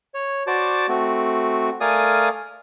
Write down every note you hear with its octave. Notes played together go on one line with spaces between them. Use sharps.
C#5
F#4 C5 D5 A5 D6
A3 C4 F#4
A3 A#4 D5 F5 G#5 D#6